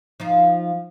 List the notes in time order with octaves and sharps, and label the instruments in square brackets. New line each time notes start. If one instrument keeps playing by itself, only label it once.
[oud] F3 D#4 F4